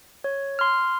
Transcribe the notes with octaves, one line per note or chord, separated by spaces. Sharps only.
C#5
C6 F6